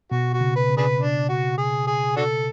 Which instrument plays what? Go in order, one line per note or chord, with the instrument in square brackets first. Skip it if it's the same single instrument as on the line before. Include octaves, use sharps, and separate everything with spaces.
[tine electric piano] B2 [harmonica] F#4
[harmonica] F#4
[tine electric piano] C#3
[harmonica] B4
[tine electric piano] C#3
[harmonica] D4 G#4 B4
D4
F#4
G#4
G#4
D4 F#4 A4